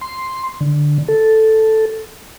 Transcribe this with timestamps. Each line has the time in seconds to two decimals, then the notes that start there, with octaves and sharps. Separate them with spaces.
0.01 C6
0.61 D3
1.08 A4